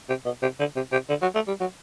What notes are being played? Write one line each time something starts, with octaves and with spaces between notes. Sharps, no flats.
C3
B2
C3
D3
C3
C3
D3
F#3
A3
G3
F#3